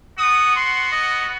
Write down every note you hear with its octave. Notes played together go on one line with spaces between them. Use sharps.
B3 F#4 D#6
C6
D#5